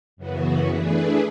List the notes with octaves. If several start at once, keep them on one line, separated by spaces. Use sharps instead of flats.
F#2 C#3 E3 B3 F#4
E3 A3 D4 G#4 B4